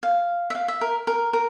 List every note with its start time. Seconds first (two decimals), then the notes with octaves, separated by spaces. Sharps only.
0.03 F5
0.50 E5
0.55 F5
0.68 E5
0.81 A#4
1.07 A#4
1.33 A#4